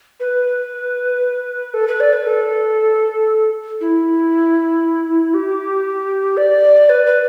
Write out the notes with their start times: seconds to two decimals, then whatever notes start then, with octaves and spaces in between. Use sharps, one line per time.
0.20 B4
1.74 A4
1.88 B4
2.00 D5
2.13 B4
2.26 A4
3.81 E4
5.34 G4
6.37 D5
6.89 B4
7.06 B4